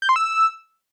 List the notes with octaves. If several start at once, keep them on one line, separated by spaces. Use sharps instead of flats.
G6
C6
E6